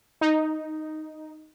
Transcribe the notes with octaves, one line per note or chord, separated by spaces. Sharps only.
D#4